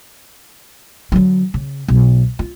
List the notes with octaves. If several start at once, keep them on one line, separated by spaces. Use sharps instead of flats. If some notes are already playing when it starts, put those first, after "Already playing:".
D3 F#3
C#3
B1
F4